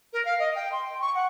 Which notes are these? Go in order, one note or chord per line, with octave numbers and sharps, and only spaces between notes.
A#4
F5
D#5
G5
C6
G5
C#6
F#5